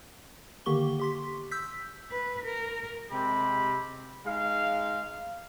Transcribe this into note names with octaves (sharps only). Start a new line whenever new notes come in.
D3 D#3 A#3 G4 C#6 G7
G4 C6 B6
E6 G6 B6
B4
A#4
C3 G#3 C4 G4 B5
G#3 D#4 F5